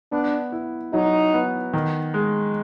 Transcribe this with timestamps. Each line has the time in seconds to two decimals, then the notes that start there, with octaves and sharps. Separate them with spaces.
0.12 B3 D4
0.52 E4
0.93 F#3 D#4
1.34 B3
1.73 D#3
2.14 G#3